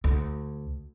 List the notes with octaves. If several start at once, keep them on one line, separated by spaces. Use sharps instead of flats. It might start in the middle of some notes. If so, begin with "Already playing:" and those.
D2